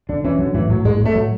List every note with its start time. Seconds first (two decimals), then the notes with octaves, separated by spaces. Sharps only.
0.09 D3 D4
0.24 E3 C#4
0.39 D3 F#3
0.54 A2 E3
0.69 A2 F#3
0.85 A2 G#3
1.00 A2
1.05 A3
1.15 F#3